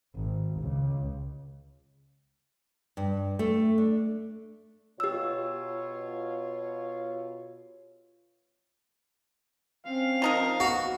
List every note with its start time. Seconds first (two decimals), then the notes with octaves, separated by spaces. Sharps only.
0.15 G#1
0.60 C#2
2.97 G2
3.39 A3
3.78 D4
5.00 B2 F4 G4 C#5 E6
9.86 C4 C#4 F5
10.22 F3 D#4 A#4
10.60 B3 F#4